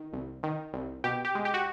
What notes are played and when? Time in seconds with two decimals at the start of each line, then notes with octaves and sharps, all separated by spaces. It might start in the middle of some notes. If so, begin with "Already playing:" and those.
Already playing: D#3
0.13 C2
0.43 D#3
0.73 C2
1.04 B2 G4
1.25 G4
1.35 G#3
1.45 G4
1.54 F#4